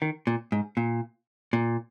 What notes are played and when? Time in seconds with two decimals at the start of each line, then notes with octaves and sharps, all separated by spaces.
0.02 D#3
0.27 A#2
0.52 G#2
0.77 A#2
1.53 A#2